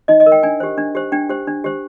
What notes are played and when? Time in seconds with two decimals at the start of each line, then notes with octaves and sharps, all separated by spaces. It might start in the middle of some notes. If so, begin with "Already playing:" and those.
0.08 D#4 D#5
0.20 D#5
0.26 A#4
0.32 G5
0.43 D4 G#5
0.60 G4 C5
0.78 D4
0.95 G4 C5
1.12 D4 G5
1.29 G4 C5
1.47 D4
1.64 G4 C5